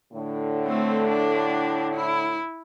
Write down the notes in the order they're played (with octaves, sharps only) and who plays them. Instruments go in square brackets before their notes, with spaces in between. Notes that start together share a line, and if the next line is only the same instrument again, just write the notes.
[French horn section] A2 D3
[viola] A3 C4
D4
E4